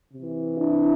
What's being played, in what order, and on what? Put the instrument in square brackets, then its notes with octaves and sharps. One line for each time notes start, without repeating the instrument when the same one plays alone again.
[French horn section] C3 E3
D4 E4